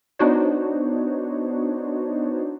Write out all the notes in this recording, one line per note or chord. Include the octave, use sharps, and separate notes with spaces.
B3 D4 D#4 F#4 C5 C#5